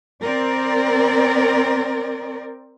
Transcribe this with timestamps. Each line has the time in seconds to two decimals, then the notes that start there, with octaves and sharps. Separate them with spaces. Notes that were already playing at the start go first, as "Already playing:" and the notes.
0.22 C4 A#4 D5